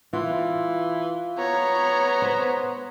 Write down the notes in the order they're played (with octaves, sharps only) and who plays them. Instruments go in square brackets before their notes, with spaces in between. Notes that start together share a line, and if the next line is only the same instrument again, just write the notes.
[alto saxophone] E3 [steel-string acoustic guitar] F4
[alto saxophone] B3 [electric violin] C#5 A#5
[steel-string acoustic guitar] C5